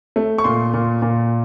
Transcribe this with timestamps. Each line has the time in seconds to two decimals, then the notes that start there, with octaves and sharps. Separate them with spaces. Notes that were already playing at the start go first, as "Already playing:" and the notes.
0.16 A3
0.38 C#6
0.44 A#2 C6
0.73 A#2
1.02 A#2